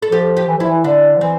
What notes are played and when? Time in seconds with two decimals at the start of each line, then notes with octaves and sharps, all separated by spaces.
0.02 A4
0.12 F3 G4
0.37 G4
0.48 E3
0.58 F3 E4
0.68 E3
0.84 D3 D4
1.17 F3
1.21 E3 C4